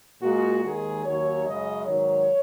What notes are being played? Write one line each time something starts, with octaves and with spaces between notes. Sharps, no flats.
A#2 G#3 F#4
D#2 D#3 G#3 G#4
D#2 D#3 F#3 C#5
F#2 C#3 G#3 D#5
G#2 D#3 F#3 C#5